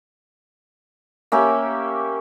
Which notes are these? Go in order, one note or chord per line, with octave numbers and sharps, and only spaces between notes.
A#3 C#4 G4 E5